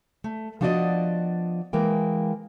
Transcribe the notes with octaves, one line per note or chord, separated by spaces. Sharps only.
A3
F3 B3 D4 F#4 D5 D#5
E3 G#3 A#3 G5